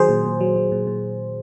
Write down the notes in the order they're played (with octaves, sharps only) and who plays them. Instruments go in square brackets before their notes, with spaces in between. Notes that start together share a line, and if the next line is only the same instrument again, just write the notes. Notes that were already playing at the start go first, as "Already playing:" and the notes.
Already playing: [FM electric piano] D#3 F#3 G#4 C5
A#2
A#2
F#3
F#3
A#2
A#2